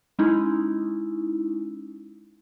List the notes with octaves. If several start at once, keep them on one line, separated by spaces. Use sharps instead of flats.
G#3 C#4 D#4 E4